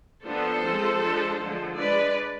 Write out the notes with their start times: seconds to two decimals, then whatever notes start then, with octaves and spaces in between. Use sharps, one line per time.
0.25 F3 B3 D4 A4 C5
0.64 F3 G#3 C4
1.02 F3 G#3 D4
1.40 D3 F3 G#3
1.78 G#3 D4 B4 D5